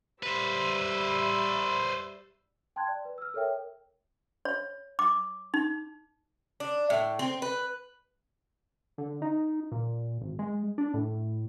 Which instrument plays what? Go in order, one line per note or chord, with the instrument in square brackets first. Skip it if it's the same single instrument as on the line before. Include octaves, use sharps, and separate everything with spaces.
[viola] G3 E5 [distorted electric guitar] B4 C5
[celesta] G5 A5 C6 F#6 G#6
D5
B4
E6 F6
A4 A#4 C#5 E5 G5
[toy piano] C#5
D6
D#4
[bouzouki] D4
A2
C4
B4
[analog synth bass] D3
D#4
A#2
G#1
G#3
D4
A2